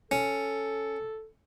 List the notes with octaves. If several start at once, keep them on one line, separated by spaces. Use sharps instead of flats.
C#4 A4